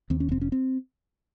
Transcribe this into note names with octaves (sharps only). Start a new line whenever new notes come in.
D#2 C4
C#4
F1 C4
C#4
C4